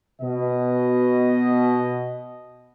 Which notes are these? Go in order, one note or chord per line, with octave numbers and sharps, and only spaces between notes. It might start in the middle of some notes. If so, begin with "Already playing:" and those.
B2 D#5